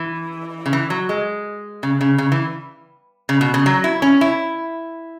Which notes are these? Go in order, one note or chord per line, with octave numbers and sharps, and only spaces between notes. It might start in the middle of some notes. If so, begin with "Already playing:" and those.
Already playing: E3
C#3
E3
F#3
G#3
C#3
C#3
C#3
E3
C#3
B2
C#3
F#3
E4
C#4
E4